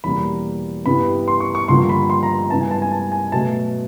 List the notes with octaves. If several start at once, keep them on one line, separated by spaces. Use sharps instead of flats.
E2 B2 G3 A#3 B5
G2 E3 G3 B3 B5
C6
C#6
C#6
G2 D3 F3 A#3 C6
B5
C6
A#5
G2 E3 G#3 B3 A5
G#5
A5
G#5
A5
G#5
B2 F#3 A3 A5